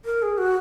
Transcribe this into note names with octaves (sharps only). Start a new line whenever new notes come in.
A#4
G#4
F#4